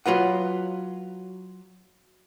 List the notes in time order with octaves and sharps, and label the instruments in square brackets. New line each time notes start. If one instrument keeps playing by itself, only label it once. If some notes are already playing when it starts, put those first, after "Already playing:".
[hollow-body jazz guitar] F#3 F4 B4 F#5